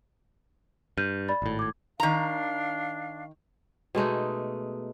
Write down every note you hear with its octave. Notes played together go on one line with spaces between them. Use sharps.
G2 F6 G6 D#7
D5 B5 A6
G#1 A2
D6 G#6
D#3 D4 F5 A#5
B2 G#3 A3 D#4